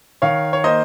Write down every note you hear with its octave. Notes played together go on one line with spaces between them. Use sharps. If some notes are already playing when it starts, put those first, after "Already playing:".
D#3 C#5 F5
C#5
A#3 C5 D#5